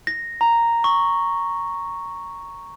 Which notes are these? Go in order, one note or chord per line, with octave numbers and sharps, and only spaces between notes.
A#6
A#5
C#6